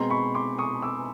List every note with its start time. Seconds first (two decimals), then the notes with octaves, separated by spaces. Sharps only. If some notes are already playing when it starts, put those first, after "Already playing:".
Already playing: B2 G#3 C4 A#5 C6
0.10 B5 C#6
0.34 C6 D6
0.59 C#6 D#6
0.82 D6 E6